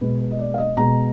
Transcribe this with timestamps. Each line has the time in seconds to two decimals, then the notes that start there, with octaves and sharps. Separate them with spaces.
0.01 B2 G#3 B4
0.21 B4
0.31 D#5
0.39 D5
0.54 F5
0.58 D#5
0.77 B2 G#3 A#5